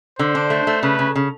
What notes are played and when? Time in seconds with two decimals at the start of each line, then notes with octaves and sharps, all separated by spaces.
0.19 D3 C5
0.35 D4
0.50 A3
0.67 A3
0.83 C#3 B4
0.99 C#3
1.16 C#3